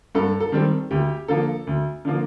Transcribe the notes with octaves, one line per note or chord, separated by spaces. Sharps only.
G2 A4
A4
D#3 G3 C4
D2 G4
D3 F3 A#3 A4
D2
D3 F3 A#3